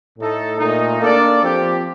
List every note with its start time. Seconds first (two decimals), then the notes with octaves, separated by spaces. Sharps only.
0.18 A2 A3 D#4 A4
0.58 A#2 A3 D#4
1.00 A#3 D4 A4 D5
1.41 F3 C4 G4